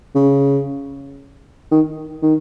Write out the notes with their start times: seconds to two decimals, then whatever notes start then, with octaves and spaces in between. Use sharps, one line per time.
0.15 C#3
1.71 D#3
2.22 D#3